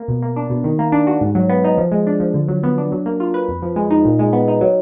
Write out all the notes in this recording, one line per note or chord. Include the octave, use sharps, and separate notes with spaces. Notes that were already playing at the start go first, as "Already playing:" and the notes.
Already playing: A#3
B2
A#3
D4
B2
D#3
A#3
D4
F#4
G#2
F#3
B3
D#4
F3
G#3
D4
F3
D3
F#3
B3
D4
F#3
A#3
F4
B4
F2
F3
G#3
D#4
A#2
G#3
B3
D#4
F#3